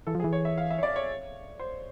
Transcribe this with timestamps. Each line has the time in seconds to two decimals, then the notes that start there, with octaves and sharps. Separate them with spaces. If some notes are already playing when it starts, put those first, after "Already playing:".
0.07 E3 A4
0.15 F3
0.20 G#4
0.24 E3
0.33 C#5
0.45 E5
0.58 F5
0.71 E5
0.78 C#5
0.83 D5
0.96 C#5
1.60 C5